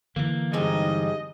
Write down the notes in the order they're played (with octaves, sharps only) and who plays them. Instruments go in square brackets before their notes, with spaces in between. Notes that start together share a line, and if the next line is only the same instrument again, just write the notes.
[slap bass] D3 E3 [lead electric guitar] A#3
[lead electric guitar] G2 G3 [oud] G#3 C4 D#4 [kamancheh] D#5